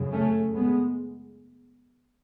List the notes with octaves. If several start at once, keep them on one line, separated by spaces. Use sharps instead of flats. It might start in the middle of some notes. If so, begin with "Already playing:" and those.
Already playing: F#2 C#3
A3 C#4
G#3 B3